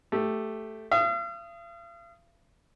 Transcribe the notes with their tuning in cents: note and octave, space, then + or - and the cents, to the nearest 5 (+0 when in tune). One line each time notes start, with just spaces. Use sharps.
A3 +0 G4 +0
F5 -45 D#6 +0